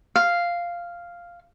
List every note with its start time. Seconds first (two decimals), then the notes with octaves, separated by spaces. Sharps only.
0.16 F5